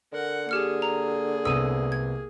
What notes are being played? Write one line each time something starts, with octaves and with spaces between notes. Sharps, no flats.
D3 A#4 F#5
A#3 G4 G#4 F6 C#7
A#5
C2 B3 D#6 E6 D#7
G#6